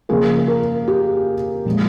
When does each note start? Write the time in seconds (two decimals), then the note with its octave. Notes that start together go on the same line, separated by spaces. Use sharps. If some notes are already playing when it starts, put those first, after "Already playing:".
0.09 C#3 F3 A#3 G#4
0.48 A#4
0.88 G4
1.65 A#2 F3 G#3